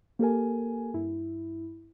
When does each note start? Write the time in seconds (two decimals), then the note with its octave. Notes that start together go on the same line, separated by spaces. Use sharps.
0.19 A#3 G4 A4 A#4 G#5
0.94 G2 E4